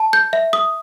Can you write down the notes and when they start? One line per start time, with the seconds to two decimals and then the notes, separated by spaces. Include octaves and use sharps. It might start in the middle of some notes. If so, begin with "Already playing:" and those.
Already playing: A5
0.13 G6
0.33 E5
0.53 D#6